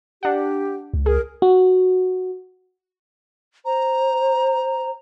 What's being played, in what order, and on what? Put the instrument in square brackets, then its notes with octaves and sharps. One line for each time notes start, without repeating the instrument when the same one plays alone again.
[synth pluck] D4 F#5 [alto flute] G4
[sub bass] C#2
[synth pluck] G#4 [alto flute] A#4
[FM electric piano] F#4
[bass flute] C5 [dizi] A#5